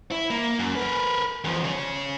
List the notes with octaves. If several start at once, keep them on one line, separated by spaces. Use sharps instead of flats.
E4
A#3
F#2
A#4 B4
E2 F3
C#3 C#5